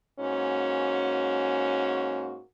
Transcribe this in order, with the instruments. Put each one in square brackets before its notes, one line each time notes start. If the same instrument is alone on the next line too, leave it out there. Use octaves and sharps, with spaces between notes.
[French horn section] G#2 A#3 C#4 F#4